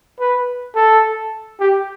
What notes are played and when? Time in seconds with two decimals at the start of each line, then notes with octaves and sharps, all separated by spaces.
0.20 B4
0.76 A4
1.60 G4